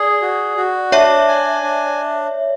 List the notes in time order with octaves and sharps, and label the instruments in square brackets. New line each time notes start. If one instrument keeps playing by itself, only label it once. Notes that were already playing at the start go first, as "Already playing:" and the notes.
Already playing: [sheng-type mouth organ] G#4 [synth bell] D5
[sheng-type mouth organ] F#4
F#4
[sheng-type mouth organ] D4 [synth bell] C#5 E5
[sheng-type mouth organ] G#5
D4